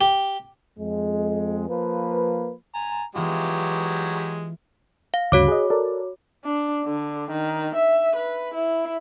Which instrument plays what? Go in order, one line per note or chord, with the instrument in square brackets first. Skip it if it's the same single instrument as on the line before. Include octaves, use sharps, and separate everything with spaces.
[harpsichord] G4
[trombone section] F2 G#3
F3 A#3 B4
[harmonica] G#5 A#5
[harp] E3 B3 F4 [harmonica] F#3 G#3 G4
[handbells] F5
[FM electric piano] D2 G2 C#3 [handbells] F#4 C#5 D6
[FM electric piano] G#4 D#5
A4 A#4 D5
[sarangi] D4
D3
D#3
E5
B4
E4